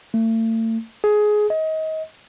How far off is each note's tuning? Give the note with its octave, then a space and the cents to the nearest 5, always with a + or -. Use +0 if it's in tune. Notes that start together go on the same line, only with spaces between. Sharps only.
A3 +40
G#4 +15
D#5 +25